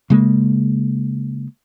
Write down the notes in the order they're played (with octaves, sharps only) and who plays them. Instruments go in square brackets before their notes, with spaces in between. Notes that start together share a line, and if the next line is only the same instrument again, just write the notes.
[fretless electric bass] C#3 G#3 A#3